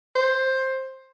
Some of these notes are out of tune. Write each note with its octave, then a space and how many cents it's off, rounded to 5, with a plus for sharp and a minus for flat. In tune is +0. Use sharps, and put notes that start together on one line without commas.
C5 +10